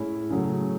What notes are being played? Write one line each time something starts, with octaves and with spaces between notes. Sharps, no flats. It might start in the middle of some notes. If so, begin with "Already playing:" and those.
Already playing: A2 G#3 C#4 E4
C#3 F#3 A3